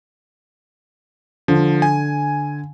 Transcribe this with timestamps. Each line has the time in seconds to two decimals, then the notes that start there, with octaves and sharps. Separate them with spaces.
1.48 D3 F3
1.82 G#5